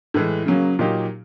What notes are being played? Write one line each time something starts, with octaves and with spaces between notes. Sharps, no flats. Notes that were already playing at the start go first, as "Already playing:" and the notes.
A2 E3 G#3
C#3 F#3 A#3 C#4
A#2 F#3 A#3 D#4 G4